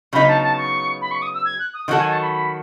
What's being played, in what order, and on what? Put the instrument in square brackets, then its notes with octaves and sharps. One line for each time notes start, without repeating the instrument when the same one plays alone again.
[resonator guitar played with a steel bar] C#3 F#3 B3 D#4 [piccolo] B5
[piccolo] A5
A5
C#6
B5
C#6
D#6
E6
G#6
F#6
D#6
[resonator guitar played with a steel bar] D#3 F#3 C#4 F#4 A4 [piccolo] F#5
[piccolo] G#5
A5
B5
B5